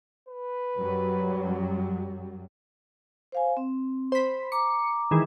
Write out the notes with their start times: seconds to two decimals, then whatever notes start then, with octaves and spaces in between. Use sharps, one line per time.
0.29 B4
0.77 F#2 F#3 G3
3.32 C5 F5 G#5
3.57 C4
4.12 C5 B5
4.52 A#5 D6 C#7
5.11 D#3 E3 G#3